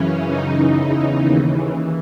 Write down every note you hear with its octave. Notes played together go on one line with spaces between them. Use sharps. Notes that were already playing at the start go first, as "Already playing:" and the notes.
Already playing: F#2 C#3 E3 C#4
F#2 C#3 E3 D#4
E2 C#3 E3
D#2 C#3 E3
E3